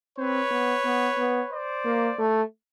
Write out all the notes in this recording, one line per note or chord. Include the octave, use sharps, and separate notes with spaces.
C4 B4 C#5
B3
B3
B3
C5 D5
A#3
A3